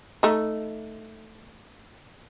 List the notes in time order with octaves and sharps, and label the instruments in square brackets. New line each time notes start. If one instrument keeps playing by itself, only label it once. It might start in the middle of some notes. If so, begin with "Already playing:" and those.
[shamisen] A3 D#4